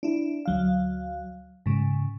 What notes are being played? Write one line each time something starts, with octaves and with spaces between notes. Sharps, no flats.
D4 E4
D2 F#3 F5
G#2 C#3